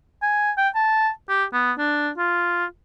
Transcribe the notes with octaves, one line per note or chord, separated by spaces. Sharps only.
G#5
G5
A5
G4
B3
D4
F4